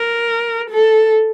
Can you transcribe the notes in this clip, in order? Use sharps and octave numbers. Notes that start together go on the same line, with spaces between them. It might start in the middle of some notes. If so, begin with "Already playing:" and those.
Already playing: A#4
A4